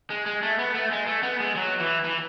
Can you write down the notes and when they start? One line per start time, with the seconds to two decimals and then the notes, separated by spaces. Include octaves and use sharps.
0.10 G#3
0.26 G#3
0.43 A3
0.59 B3
0.75 A3
0.92 G#3
1.07 A3
1.23 B3
1.40 G#3
1.56 F#3
1.80 E3
2.05 E3